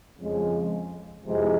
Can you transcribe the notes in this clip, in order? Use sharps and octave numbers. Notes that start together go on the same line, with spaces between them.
F2 C#3 F3 G#3
F2 C3 E3 G#3